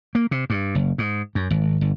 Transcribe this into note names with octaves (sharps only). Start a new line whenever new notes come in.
A#3
C3
G2
F#1
G#2
F#2
G#1
G1